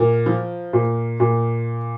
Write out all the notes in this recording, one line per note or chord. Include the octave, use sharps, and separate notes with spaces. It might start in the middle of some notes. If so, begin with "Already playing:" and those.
Already playing: A#2 A#4
F3
A#2
A#2